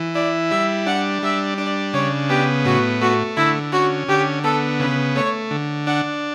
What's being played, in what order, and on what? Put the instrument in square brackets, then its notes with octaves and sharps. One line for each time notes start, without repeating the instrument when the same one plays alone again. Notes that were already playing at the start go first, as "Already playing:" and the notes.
Already playing: [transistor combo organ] E3
[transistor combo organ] E4 [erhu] D5
[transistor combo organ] G3 [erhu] E5
[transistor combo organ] D4 [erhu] F#5
[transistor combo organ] G3 [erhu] E5
[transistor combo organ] D4 [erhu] D5
[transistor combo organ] C#3 [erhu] C#5
[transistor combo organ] B3 [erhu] G4
[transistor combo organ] A2 [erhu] F#4
[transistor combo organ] A3 [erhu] F#4
[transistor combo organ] D3 [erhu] E4
[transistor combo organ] C#4 [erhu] F#4
[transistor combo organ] D3 [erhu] G4
[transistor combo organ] B3 [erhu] A4
[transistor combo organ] C#3 [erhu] B4
[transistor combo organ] A3 [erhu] C#5
[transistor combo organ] D3
[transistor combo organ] D4 [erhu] F#5